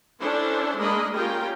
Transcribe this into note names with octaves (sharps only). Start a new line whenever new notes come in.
C#4 D4 E4 A4 C5
G#3 A#3 D4 A#4 D#5 B5
A#3 C#4 F4 G4 A#4 G5